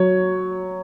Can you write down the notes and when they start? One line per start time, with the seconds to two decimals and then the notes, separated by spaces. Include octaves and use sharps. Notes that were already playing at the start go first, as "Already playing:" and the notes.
Already playing: F#3 C#5